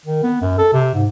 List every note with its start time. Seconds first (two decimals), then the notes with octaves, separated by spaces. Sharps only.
0.05 D#3
0.23 B3
0.41 F#2
0.58 A4
0.73 C3
0.94 G#2